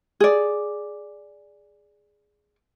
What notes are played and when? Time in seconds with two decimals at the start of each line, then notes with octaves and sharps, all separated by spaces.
0.20 G#4 D5